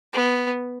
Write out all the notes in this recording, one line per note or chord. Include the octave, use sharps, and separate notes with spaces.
B3